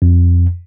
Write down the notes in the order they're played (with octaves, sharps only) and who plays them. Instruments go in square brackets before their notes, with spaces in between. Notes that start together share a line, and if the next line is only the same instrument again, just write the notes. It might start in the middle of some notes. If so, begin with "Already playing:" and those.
[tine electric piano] F2